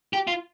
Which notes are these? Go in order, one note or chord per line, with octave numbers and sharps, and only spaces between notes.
G4
F4